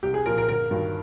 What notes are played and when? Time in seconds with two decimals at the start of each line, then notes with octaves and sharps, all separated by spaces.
0.03 C2 G4
0.14 G#4
0.25 A#2 F3 A#4
0.38 A#4
0.49 G1 A#4
0.71 G2 D#3 F#3